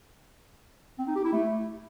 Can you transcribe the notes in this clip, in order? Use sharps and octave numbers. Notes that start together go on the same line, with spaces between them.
C4
D#4
G4
E4
A3